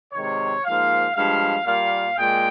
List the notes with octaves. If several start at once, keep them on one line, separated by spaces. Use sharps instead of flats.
C3 D#3 G#3 C#5
G#2 F3 A#3 F5
G2 F3 G#3 F5
A#2 G3 A#3 F5
A#2 G#3 G5